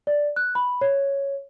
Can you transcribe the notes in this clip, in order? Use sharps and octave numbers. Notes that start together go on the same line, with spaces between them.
D5
F#6
B5
C#5